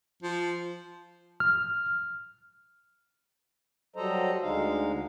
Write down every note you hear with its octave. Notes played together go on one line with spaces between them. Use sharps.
F3
F6
F#3 G3 A4 C5 D#5 A#5
D2 D3 G#3 D#4 F5